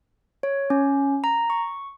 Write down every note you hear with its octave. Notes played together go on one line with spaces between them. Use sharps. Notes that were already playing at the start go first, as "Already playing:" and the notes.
C#5
C#4
A#5
C#6